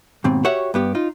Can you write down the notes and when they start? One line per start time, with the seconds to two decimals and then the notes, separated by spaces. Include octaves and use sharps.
0.24 D#2 G#2 B2 C4
0.45 F#4 G4 C#5 E5 F#5
0.74 G2 B3 G4
0.95 D#4 F4